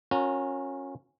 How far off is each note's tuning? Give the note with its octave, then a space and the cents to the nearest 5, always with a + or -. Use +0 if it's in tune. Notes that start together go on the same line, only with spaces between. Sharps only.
C#4 -15 F#4 -40 A#4 +0